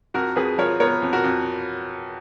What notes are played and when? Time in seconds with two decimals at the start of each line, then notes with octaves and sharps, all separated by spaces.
0.14 F2 F#4 A#4
0.36 F2 G#4 B4
0.58 F3 A#4 C#5
0.80 B3 A#4 C#5
1.02 F2
1.13 F#4 A#4
1.24 F2